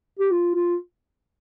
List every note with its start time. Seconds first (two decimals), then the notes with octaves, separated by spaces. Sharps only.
0.19 G4
0.31 F4
0.55 F4